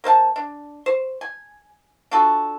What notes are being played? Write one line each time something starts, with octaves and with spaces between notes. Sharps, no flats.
A#3 C5 F5 A5
D4
C5
G#5
D4 F4 F#4 A4